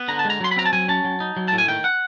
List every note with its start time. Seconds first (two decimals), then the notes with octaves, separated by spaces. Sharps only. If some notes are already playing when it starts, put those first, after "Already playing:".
Already playing: B3
0.08 D3 A#5
0.19 A5
0.25 G#3
0.30 A#5
0.41 F#3 C6
0.51 B5
0.56 C4 A#5
0.66 A5
0.73 F#3 G#5
0.88 C#4 A5
1.04 F#3
1.20 D#4
1.36 F#3
1.48 A2 A5
1.58 G#5
1.68 D#3 G5
1.84 F#5